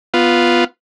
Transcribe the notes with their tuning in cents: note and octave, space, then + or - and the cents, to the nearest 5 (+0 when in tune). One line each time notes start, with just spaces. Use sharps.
B3 +0 F4 +0